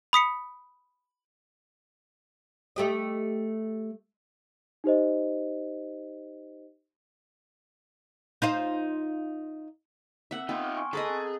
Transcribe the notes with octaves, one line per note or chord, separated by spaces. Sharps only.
B5 D#6 B6 C#7
A3 G4 D#5
D#4 G4 C5 D#5
D#4 F4 C5
C4 A#4 E5 F#5
B3 D#4 F4 G5
C6 D6 F6
G#5 C6 C#6
G#4 A4 B4 D#5 A#5
C4